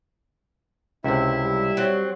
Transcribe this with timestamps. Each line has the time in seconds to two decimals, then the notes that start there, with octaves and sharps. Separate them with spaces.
1.04 C#2 C3 E4 E5
1.44 G3
1.77 F#3 C4